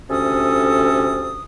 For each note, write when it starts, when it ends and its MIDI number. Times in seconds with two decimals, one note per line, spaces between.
0.10 1.41 38
0.10 1.41 48
0.10 1.41 61
0.10 1.41 69
0.10 1.41 87